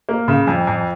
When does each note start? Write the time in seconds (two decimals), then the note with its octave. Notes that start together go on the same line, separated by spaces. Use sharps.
0.09 A#3
0.28 C#3
0.47 F2
0.67 F2